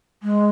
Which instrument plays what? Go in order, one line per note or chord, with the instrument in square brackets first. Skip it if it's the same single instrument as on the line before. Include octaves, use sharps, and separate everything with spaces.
[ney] G#3